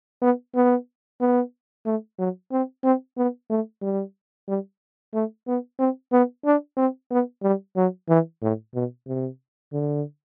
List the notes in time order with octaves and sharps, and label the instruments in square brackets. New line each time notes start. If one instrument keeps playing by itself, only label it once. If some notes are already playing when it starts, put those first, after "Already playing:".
[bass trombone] B3
B3
B3
A3
F#3
C4
C4
B3
A3
G3
G3
A3
B3
C4
B3
D4
C4
B3
G3
F#3
E3
A2
B2
C3
D3